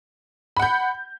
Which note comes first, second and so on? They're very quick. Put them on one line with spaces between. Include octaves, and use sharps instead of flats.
B5 F#5 G6